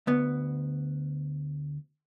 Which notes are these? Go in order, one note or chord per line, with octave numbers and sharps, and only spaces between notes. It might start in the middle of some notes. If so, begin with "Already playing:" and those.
D2 B3